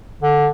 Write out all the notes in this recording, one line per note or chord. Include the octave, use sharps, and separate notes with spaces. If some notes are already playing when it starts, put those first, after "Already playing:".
D3